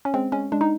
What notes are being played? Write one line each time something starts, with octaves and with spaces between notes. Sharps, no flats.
C#4
G#3 C4
G#3 C#4
G#3 D4
D#4